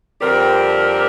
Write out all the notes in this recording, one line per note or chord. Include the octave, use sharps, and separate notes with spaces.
F2 D3 G3 C4 G4 A#4